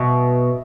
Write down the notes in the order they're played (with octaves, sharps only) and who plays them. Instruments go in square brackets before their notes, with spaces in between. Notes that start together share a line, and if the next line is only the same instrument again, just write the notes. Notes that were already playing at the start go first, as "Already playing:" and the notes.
Already playing: [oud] B2 [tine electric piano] D#5 E5